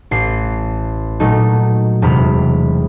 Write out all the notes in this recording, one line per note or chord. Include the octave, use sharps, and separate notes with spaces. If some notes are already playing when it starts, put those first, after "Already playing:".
A1 C7
A#2 F#3 A3 D#4
E1 C3 B5 F6